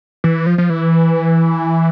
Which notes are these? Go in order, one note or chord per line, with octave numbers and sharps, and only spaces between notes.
E3
F3
F3
E3